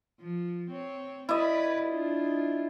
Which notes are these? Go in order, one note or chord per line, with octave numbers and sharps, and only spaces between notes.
F3
C4 C#5
E4 B4 D5 D#5
D4 F4